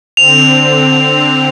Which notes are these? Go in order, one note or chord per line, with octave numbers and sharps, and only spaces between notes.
D3 C4 F7